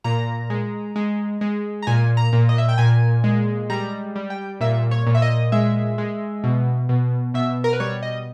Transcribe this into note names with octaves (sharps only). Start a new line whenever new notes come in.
A#2 A#5
G#3
G#3
G#3
A#5
A#2 G#5
A#5
A#2
D#5
E5
G5
A#2 G#5
G#3
G3 A#5
G3
G5
A#2 E5
C#5
A#2
E5
D#5
G#3 E5
G#3
B2
B2
B2 E5
A#4
B4
G3 C#5
D#5